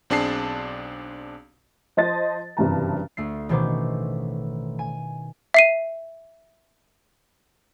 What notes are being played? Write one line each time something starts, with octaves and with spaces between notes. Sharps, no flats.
B1 C4 D4 G#4 A5 C7
F3 C5 D#5 A5 A6
F#1 G2 C3 E3 A5 A#5
D2 A3 C7
A1 B2 D#3 C5 C#6 D6
G#5
E5 C7 D#7